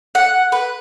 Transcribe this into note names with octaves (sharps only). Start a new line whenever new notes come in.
F#5
B4